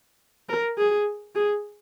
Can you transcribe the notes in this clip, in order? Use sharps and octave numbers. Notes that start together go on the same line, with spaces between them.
A#4
G#4
G#4